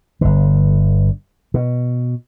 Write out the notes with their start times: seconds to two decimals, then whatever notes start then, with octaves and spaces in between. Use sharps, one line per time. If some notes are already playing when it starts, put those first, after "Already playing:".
0.21 G1 D3
1.54 B2